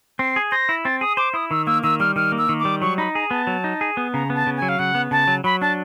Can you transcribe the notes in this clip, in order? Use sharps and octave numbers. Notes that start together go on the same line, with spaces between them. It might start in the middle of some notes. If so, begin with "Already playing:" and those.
C4 C7
G#4
C5 A#6
E4
C4 A6
G#4 D#6
C5 D6
E4 D#6
D#3 E6
A#3 E6
D#3 E6
G3 F6
D#3 F6
A#3
E6
D#3
D6
G3
F#3 C#6
D#4 B5
G#4 A#5
B3 A5
F#3
D#4
G#4
B3
C#3 A#5
B3
A5
C#3
G#5
F#3
F5
C#3 F#5
B3
C#3 A5
F#3
F#3 B5
D4 A5